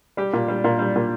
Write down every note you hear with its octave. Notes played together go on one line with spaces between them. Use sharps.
G3 G4
A#2
G3
A#2
G3
A#2